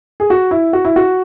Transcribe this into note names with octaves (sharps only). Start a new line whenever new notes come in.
G#4
F#4
E4
F#4
E4
F#4